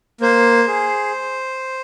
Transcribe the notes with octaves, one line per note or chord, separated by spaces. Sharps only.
A#3 C5
G#4